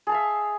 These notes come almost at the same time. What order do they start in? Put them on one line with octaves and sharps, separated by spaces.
G#4 A5 F5 E5